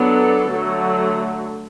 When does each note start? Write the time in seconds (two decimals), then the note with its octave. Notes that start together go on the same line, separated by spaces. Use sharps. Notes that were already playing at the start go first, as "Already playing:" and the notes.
Already playing: F#3 B3 D4 A4
0.49 D3 F#3 A3